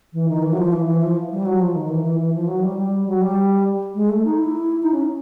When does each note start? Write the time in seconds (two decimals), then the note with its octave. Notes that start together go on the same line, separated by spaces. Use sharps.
0.13 E3
0.28 D#3
0.42 E3
0.52 F#3
0.57 F3
0.73 E3
0.87 E3
1.02 F3
1.31 G3
1.46 F#3
1.60 F3
1.75 D#3
1.89 E3
2.04 E3
2.19 E3
2.34 F3
2.48 F#3
2.63 G3
2.77 G3
3.07 F#3
3.21 G3
3.94 G#3
4.09 A3
4.24 D#4
4.38 E4
4.82 D#4
4.92 C#4